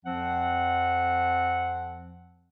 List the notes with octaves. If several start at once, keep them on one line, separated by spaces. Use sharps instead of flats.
F2 F3 C4 F#5